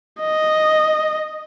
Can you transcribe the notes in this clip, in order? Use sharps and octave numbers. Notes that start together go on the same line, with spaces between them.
D#5